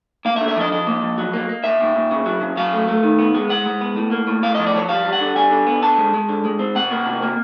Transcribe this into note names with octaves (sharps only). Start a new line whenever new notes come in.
A#3 F5
E5
D3
E5
F3 D#5
F3 D#5
A#3
F3
F#3
A#3
A#3
A#2 E5
A#2
A#2
C#3
F#3
C#3
F#3 F5
A3
A3
D#3
B3
G#3
G#3 F#5
G#3
B3
A2
A#3
A2
A2 F5
F3 D#5
D5
F3 C#5
G3 F5
G3
F#5
D3
G3 G#5
D3
B3
D3 A5
G#3
G#3
D3
G#3
C4
C3 F#5
A#3
C3
A#3